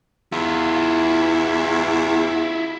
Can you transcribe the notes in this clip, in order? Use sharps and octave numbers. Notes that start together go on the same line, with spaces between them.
E2 E4 F4